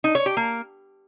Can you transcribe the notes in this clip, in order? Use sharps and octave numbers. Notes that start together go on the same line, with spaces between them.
D#4
C#5
G4
A#3